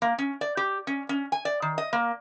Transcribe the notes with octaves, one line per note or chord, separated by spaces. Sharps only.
A#3
C#4
D5
G4
C#4
C#4
G#5
D5
D#3
D#5
A#3